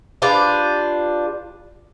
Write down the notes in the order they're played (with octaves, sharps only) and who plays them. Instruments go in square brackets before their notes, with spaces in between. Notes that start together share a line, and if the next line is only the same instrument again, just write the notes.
[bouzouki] D4 F4 G4 B4